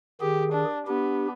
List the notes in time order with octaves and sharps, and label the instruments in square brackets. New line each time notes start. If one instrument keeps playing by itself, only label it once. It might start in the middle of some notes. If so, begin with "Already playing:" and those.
[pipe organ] D#3 G#4 [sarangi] G4
[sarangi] D4
[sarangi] B3 [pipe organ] D4 G4